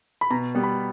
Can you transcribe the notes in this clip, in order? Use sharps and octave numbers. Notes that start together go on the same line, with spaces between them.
B5
B2 A#5
G3 B3
B5